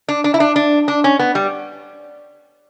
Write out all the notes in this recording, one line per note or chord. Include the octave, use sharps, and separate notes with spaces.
D4
D4
E4
D4
D4
D4
C#4
B3
G3